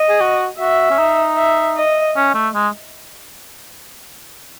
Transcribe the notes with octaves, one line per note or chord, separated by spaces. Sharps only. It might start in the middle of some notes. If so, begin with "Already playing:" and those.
Already playing: D#5
G#4
F#4
F#4 E5
C#4
D#4
E5
D#5
C#4
A3
G#3